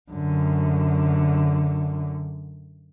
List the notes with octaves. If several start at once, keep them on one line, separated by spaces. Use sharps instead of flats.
F#2 D3